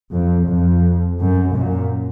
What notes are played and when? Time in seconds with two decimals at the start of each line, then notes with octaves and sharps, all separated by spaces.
0.12 F2
0.48 F2
1.19 F#2
1.54 F#2 A#2